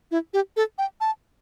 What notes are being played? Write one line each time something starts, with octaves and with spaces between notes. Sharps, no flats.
E4
G4
A4
G5
A5